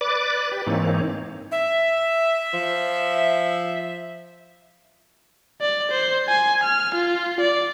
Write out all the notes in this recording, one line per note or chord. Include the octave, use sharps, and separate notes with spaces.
B4 D5 D6 A6
G4 B4
G#2 E3 A#3 C4 D#4 C#5
E5
F3
D5
C5
G#5
F6
F4
D5